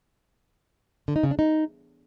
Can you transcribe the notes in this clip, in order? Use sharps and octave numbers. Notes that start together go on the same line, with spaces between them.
D3
D#4
C#3
D4
D#4